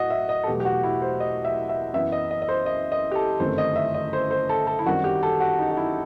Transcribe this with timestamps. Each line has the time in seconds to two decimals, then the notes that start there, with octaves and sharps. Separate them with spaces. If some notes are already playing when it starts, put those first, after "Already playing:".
Already playing: A2 F#4 D#5
0.10 E5
0.29 D#5
0.43 A4
0.47 E2 B2 F#3 A3 G4
0.60 G4
0.65 F#4
0.83 E4
1.02 C5
1.20 D#5
1.45 E5
1.69 E5
1.93 F#2 E3 B3 E5
2.12 D#5
2.31 D#5
2.42 D#5
2.49 C5
2.66 D#5
2.92 D#5
3.11 G4
3.15 A4
3.40 G1 F#2 D#3 A3 C4 C5
3.58 D#5
3.76 E5
3.94 D#5
4.13 C5
4.31 C5
4.49 A4
4.67 A4
4.79 E4
4.86 F#2 D#3 G3 C4 F#4
5.04 G4
5.23 A4
5.40 F#4
5.59 D#4
5.71 F#4
5.77 E4